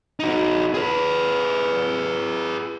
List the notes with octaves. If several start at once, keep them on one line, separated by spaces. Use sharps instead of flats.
D#4 F#4
G#4 B4